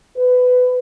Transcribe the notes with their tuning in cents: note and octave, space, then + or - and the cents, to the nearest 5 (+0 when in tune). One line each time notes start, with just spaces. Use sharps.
B4 +20